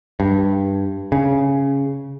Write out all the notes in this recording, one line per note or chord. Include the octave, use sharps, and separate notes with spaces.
G2
C#3